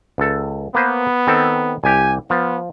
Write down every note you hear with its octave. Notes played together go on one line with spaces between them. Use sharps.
C#2 A4
A#3 B3 B4 C5
D#3 C4 A4
C2 G4 G#5
F3 B3